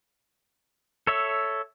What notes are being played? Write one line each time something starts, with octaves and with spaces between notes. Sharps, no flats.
A4 C#5 E5